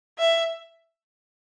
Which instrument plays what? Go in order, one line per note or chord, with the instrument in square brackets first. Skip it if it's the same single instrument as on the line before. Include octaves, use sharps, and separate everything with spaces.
[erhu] E5